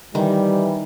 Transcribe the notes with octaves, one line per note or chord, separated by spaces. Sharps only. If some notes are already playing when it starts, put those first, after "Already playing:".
D#3 E3 G3